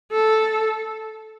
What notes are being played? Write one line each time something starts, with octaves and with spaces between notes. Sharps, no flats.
A4